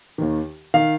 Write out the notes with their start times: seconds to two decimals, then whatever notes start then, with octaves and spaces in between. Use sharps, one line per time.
0.18 D#2 D#3
0.74 D#3 F5